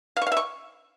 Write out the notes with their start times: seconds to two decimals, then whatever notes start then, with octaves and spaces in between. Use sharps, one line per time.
0.17 F5
0.22 C#6
0.27 F5
0.32 E5
0.37 C#6